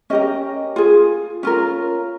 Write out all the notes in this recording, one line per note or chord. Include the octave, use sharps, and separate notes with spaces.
C#4 G4 A#4 D#5
F4 G#4
C#4 F4 A#4